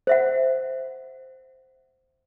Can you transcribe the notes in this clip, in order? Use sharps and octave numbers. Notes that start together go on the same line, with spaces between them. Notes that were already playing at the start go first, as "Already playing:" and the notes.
C5 E5 F#5